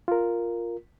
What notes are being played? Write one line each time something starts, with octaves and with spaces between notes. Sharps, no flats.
F4 A#4